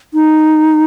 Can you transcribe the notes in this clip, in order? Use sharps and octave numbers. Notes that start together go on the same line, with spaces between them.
D#4